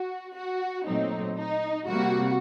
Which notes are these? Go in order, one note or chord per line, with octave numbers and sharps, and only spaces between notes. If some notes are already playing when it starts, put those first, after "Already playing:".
Already playing: F#4
F#4
A#2 F#3 A3 C4 D#4
D#4
C3 G3 A#3 F#4